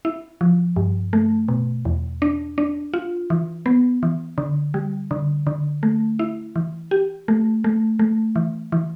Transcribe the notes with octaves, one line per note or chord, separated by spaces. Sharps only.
E4
F3
G2
A3
B2
E2
D4
D4
F4
E3
B3
E3
D3
G3
D3
D3
A3
E4
E3
G4
A3
A3
A3
E3
E3